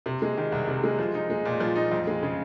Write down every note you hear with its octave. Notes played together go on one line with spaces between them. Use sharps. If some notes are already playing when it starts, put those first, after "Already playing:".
C3
G#3
D#3
C2
C3
G#3
F3
D#4
G#3
A#2
F3
D#4
F2
G#3
C#3